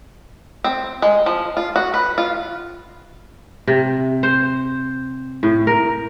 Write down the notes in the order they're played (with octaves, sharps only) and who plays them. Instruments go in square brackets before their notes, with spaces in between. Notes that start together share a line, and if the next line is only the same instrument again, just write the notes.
[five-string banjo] C4
G#3
F3
F4
F#4
B4
F4
[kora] C3
C5
A2
A#4